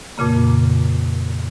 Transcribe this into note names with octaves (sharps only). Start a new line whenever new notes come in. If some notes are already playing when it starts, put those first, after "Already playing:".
F2 A#2 C#3 A#3